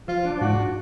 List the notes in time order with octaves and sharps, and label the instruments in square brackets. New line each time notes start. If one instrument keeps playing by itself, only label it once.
[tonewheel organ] F3 [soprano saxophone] F4
[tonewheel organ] D4
[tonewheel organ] G#2 [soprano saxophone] F#4